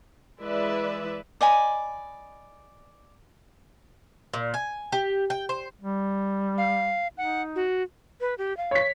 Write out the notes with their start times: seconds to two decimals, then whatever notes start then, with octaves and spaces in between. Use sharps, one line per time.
0.40 E3 G#3 B4 D5 E5
1.41 D5 D#5 G#5 B5
4.34 A#2
4.54 G#5
4.92 G4
5.30 G5
5.49 C5
5.81 G3
6.58 F5
7.18 D#4 F#5
7.56 F#4
8.21 B4
8.38 G4
8.57 F5
8.71 C#5 B6